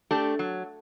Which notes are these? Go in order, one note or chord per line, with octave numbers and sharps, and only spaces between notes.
A3 D4 G4
F#3